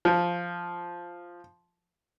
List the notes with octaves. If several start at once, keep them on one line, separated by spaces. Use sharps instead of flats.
F3